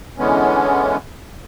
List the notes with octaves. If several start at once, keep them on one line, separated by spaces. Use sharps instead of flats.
D3 E3 G#3 B3 C#4